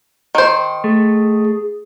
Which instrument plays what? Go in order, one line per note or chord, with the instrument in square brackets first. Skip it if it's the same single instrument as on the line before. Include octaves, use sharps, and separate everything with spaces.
[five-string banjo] D#3 C5
[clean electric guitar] A3 [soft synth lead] G#4